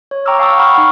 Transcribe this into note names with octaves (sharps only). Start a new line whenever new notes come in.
C#5
G5 A#5 C#6 D6 E6 F6
F5 G5 A5 C#6 D#6 E6
F#5 B5 C#6 F6
D#4 F#5